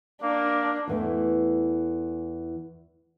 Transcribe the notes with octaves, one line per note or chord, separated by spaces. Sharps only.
A#3 D4
E2 E3 A3